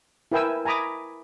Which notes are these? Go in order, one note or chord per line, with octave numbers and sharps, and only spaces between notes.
E4 A#4 B4 G5 G#5 E6
G#5 A#5 B5 D6 D#6